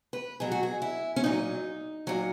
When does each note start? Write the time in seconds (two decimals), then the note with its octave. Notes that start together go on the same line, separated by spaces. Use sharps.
0.13 B4
0.40 B2 F#3 G#4
0.52 F#4
0.63 G#4
0.82 E4
1.16 C#4
1.24 A#2 F#3 D#4
2.07 A#2 F#3